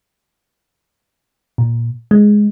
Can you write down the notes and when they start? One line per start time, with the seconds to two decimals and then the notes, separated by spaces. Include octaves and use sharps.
1.58 A#2
2.11 G#3